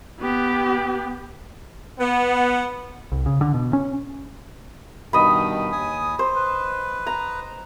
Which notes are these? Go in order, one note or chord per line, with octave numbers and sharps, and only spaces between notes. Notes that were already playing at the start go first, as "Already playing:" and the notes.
B3 G4
B3
C2
C#3
D3
B2
C#4
G2 B2 D#3 D#5 B5
D#2 G#5 D#6
C5
B4
A#5